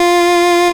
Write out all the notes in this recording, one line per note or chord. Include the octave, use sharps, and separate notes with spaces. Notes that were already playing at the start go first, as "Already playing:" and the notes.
Already playing: F4